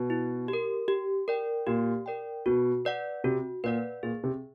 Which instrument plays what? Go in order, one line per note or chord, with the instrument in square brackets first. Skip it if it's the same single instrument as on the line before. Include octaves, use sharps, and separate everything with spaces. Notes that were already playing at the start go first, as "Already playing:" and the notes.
Already playing: [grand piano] B2
[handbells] E4
G4
A#4
G4
A#4 D5 G5
[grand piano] A#2 [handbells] G4
[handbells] A#4 D5 G5
[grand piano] B2 [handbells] F#4
[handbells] B4 D5 F#5
[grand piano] C3 [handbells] F#4
[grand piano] A#2 [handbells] B4 D5 F#5
[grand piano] A#2 [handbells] G#4
[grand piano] C3